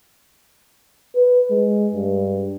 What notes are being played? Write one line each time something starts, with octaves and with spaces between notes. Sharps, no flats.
B4
G#3
G2